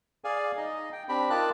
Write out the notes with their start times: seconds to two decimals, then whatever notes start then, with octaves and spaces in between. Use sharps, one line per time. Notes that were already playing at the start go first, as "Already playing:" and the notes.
0.24 G#4 D5 F5 G#5
0.57 D#4 D#5
0.93 G5
1.09 C4 D4 G4 B5
1.30 D#4 F4 A#4 A5 D6 F#6